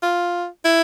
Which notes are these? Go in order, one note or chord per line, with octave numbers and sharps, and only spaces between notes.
F4
E4